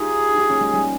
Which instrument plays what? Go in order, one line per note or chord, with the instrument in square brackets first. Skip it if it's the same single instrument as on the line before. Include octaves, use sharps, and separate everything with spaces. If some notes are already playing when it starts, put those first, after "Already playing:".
Already playing: [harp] D#4 F4 G4 [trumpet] G#4
[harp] D#4 G4
A#3 C#4
G#3
G3